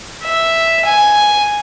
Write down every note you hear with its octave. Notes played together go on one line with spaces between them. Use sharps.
E5
G#5